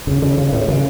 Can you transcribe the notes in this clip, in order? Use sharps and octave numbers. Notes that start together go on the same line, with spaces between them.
C#3
C#3
C#3
A2
C#3